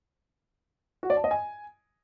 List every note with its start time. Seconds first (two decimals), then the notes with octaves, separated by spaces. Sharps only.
1.03 F#4
1.10 D5
1.17 A5
1.24 D#5
1.31 G#5